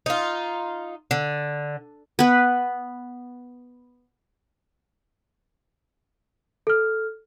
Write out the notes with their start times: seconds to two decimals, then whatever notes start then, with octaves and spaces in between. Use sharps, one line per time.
0.06 D#4 F4
1.11 D3
2.19 B3 B4
6.67 A4 F6